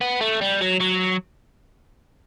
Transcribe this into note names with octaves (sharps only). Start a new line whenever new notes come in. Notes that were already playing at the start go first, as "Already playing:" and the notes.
B3
A3
G3
F#3
F#3